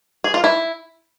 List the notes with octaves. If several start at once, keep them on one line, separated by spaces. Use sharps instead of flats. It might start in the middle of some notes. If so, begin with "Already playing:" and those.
G#4
F4
E4